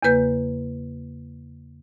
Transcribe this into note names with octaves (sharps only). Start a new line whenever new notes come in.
E2 C#3 A#3 B4 G6